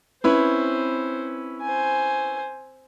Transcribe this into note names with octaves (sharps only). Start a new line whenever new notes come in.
C4 C#4 E4 B4 C5
C5 G#5